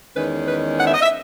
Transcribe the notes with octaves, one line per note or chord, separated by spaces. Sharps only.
E2 D#3 G#3 C#4 B4
B4
F#5
E5
D#5
E5